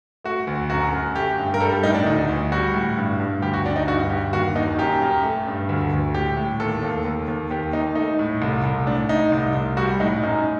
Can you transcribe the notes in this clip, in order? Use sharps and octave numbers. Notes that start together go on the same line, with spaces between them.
A3 F#4
D2
F#2 F#4
F#2
A3 G4
G2
A#4
G3 A4
G4
A2 D#4
D4
D2 D#4
D2
G3 F#4
A2
G2
G2
D2 G4
F#4
D2 D4
D#4
G2 F#4
G2 G4
D#2 F#4
D#2 D#4
F#2 G4
F#2
A3
G2
D2
D2
A2 G4
A2
D#2 A4
D#2
D#2
D#2
D#2 G4
D#2 D#4
A3 D#4
A2
C2
C2
A2 D4
A2 D#4
C2
C2
G3 F#4
A2 D#4
F#2 D#4